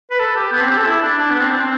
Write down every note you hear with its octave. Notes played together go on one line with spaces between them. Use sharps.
B4
A4
G4
B3
C4
G4
A4
E4
D4
D4
B3
C4
D4
C4